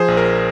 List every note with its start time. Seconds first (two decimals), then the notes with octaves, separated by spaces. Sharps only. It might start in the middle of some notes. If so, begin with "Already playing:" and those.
Already playing: F3 G#4 C5
0.08 A#1
0.17 A#4